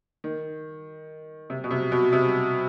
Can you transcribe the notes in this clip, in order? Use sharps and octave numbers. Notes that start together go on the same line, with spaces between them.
D#3
C3
B2
C3
B2
C3